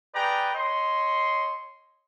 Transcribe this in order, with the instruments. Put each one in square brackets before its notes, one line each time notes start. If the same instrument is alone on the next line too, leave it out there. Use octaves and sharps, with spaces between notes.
[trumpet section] G#4 B4 D5 G5 A#5
C#5 D#5 C6